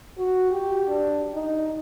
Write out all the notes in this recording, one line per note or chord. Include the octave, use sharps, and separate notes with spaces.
F#4
G4
D4
D#4